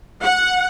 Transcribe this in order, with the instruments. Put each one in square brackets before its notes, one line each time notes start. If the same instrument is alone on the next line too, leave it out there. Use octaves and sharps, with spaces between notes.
[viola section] F#5